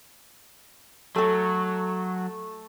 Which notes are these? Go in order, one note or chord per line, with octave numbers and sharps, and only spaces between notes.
F#3 A3 A4